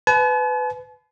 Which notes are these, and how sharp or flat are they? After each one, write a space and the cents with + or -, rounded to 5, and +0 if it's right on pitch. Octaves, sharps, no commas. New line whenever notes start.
B4 +20 A5 -45